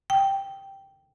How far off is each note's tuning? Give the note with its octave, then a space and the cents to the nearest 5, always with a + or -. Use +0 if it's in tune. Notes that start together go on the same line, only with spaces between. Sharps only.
G5 -5